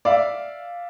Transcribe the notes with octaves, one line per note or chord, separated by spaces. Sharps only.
D5 E5 F5